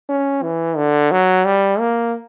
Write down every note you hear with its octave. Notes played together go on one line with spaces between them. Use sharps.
C#4
E3
D3
F#3
G3
A#3